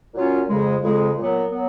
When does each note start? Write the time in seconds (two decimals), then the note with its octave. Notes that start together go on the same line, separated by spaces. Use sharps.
0.14 A#2 F#3 C#4 F4
0.49 F2 C#3 G#3
0.84 F2 C#3 G#3
1.18 A#2 F#3 B3
1.52 F#3 B3